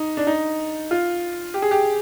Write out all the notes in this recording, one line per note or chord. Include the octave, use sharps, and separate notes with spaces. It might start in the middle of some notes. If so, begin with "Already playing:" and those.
Already playing: D#4
D4
D#4
F4
G4
G#4
G4